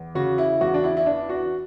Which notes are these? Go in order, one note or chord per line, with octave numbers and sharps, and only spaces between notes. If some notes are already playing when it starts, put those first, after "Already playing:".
Already playing: E2
C#3 F#4
E4
E2 F#4
D4
E4
E4
E3 D4
F#4